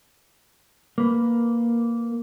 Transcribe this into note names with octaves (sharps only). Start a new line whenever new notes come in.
A#3 B4